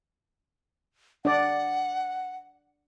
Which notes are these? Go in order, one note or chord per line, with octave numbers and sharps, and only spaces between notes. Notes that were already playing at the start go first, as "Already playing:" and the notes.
D4 D5 F#5